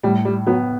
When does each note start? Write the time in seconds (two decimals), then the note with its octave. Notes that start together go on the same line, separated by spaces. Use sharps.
0.03 A2 G3
0.25 G3
0.47 F#3 B3